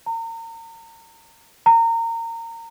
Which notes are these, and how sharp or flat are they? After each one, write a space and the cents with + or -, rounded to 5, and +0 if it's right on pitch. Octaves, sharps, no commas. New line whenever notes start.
A#5 -35
A#5 -25